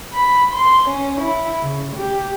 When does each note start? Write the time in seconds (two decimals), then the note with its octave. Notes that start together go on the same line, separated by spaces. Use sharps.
0.14 B5
0.54 C6
0.88 C#4
1.21 E4
1.62 C#3
1.96 G4